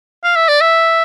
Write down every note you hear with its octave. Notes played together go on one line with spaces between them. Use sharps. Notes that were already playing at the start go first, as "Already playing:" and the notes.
F5
E5
D5
E5